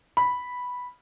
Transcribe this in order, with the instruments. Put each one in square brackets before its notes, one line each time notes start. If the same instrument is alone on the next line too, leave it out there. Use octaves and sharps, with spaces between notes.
[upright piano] B5